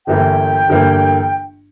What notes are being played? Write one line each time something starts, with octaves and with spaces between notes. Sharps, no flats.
G1 G2 E3 A#3 G5
G1 G2 E3 A#3